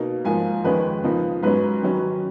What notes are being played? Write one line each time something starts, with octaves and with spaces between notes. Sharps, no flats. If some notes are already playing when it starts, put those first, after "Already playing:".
Already playing: B2 A#3 D#4
G#2 F3 A#3 G#5
F2 D#3 G#3 C#4 B4
C#3 F3 A#3 D#4
G#2 F#3 C#4 B4
D#3 F#3 C#4